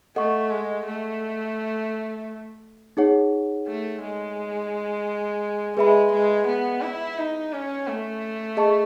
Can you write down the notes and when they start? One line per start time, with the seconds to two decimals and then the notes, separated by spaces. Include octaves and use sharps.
0.16 A3 A4 D#5 F#5 C#6
0.51 G#3
0.86 A3
2.97 D#4 G#4 C#5 F#5
3.67 A3
4.02 G#3
5.77 G#3 G#4 B4 E5 B5
6.12 G#3
6.47 B3
6.81 E4
7.17 D#4
7.52 C#4
7.87 A3
8.57 G#4 D#5 A5 C#6